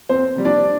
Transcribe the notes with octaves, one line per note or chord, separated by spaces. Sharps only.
F2 C4 C5
C3 G3
D4 D5